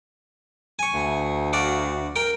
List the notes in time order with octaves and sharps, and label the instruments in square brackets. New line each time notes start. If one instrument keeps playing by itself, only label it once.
[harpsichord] G#5 C#6
[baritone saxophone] D2
[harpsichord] F#4 D5 F5
A#4 G5